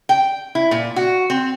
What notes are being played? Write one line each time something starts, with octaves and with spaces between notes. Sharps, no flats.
G5
E4
A#2
F#4
C4